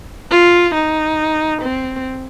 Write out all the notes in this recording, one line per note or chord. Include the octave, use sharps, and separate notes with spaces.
F4
D#4
C4